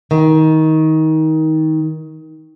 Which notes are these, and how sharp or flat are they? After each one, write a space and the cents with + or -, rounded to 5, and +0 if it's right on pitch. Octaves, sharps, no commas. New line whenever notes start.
D#3 +20